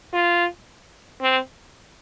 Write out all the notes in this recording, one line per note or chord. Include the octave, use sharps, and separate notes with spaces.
F4
C4